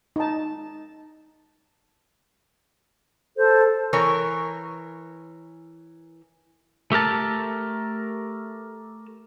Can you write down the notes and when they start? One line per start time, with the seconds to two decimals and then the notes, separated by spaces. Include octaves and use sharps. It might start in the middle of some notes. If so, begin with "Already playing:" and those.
0.16 D#4 A5
3.37 A4 C5
3.93 E3 A#4 C#5
6.92 A3 G4 A#4 A5